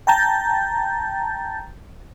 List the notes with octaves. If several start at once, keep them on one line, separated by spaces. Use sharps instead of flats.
G5 A5 A#5 G6 A6